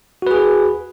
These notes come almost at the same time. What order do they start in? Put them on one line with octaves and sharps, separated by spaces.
F#4 B4 G#4